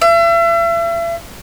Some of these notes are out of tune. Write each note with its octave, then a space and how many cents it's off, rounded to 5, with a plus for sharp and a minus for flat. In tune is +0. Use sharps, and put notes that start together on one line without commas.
E5 +40